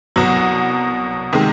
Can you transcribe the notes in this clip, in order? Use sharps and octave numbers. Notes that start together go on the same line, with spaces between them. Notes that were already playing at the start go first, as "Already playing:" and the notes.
C2 B2 F#3
C3 D#3 G#3